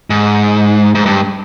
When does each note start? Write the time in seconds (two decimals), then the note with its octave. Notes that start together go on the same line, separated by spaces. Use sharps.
0.10 G#2
0.95 G#2
1.06 G2